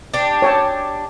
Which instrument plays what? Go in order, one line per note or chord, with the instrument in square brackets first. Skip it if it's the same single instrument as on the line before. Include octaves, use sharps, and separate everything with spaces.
[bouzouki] D4 G4
[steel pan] C#5 G5 A5